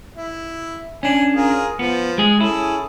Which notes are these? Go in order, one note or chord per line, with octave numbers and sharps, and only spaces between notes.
E4
C#4 D4 G#5
F4 G#4 A#4
F3 B3
G#3 G#4
C#4 E4 G#4 A4